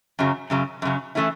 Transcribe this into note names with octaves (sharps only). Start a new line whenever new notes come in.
F#2 C#3 F#3
F#2 C#3 F#3
F#2 C#3 F#3
E3 A3 C#4 E4